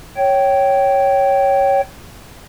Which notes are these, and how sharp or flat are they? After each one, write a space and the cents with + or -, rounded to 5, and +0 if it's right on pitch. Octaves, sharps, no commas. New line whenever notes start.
C#5 +0 G5 -15